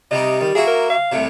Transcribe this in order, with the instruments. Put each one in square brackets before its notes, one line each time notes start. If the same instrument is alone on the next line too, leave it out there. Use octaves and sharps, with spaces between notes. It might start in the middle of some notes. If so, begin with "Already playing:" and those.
[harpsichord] C3 G3 D#4 [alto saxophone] D#5
[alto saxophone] D#3 [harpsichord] G3
[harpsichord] A#3 E4 F#4 [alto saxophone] G#4
[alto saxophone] A#4
F5
[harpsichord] C2 A2 C3